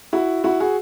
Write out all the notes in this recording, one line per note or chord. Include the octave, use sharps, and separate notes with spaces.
E4 F#4
E4 F#4
F#4 G#4